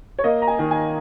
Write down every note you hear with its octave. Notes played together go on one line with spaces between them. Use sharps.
C#5
A#3 D#5
A#5
G#5
D#3
G#5